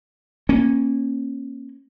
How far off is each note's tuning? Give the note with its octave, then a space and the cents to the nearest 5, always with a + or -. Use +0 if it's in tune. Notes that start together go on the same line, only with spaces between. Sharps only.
A#3 +10 C#4 -20